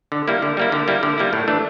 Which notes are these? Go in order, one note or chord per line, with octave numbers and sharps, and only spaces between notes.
D3
G3 A#3 E4
D3
G3 A#3 E4
D3
G3 A#3 E4
D3
G3 A#3 E4
A2
E3 A3 D4